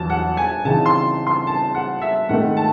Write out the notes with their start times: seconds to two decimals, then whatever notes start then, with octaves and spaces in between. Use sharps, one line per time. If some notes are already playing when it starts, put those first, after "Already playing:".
Already playing: E2 F#3 A5
0.10 F#5
0.37 G#5
0.65 C#3 E3 C4 D#4 A5
0.86 C6
1.27 C6
1.47 A5
1.74 F#5
2.02 E5
2.29 G#2 D#3 A3 F#5
2.57 A5